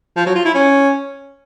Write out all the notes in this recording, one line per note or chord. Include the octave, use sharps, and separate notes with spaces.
F3
F#3
F4
E4
C#4